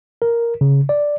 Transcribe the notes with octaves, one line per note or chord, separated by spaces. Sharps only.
A#4
C#3
D5